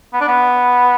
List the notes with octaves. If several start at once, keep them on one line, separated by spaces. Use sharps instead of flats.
B3
D4
B3